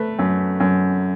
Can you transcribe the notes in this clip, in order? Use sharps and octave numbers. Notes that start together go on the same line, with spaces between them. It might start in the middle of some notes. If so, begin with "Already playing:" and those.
Already playing: A3 B4
F#2
F#2